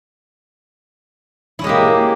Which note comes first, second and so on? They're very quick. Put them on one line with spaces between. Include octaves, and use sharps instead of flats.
E4 C#4 G#3 G4 A#3